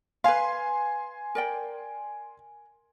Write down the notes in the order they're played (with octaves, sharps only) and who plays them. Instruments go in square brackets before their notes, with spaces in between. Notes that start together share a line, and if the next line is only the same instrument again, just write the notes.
[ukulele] B4 F5 [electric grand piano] G#5 C6
[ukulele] A#4 D5 G5